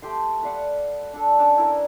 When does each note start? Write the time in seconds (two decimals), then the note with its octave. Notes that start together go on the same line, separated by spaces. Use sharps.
0.02 A3 G4 C5 C6
0.43 B4 D5 F5 F#5
1.13 D4 A4
1.38 C#4 D4 D5 A5
1.58 E4 A#4